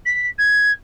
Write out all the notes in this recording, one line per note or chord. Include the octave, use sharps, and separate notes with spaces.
B6
G#6